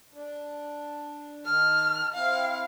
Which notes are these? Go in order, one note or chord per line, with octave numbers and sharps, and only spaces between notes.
D4
D#3 A5 F6
C4 E4 F5